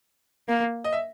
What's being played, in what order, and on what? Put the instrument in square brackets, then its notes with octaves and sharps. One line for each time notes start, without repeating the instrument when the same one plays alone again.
[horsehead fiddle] A#3
[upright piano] D#5
E5